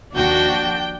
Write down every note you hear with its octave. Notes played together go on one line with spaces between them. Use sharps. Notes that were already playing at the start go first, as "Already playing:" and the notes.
D#2 F3 D4 F#4 G5